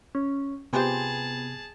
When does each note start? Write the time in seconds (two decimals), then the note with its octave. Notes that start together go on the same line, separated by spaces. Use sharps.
0.15 C#4
0.73 C3 B3 F4 G4 G#4 C5 G#5 A5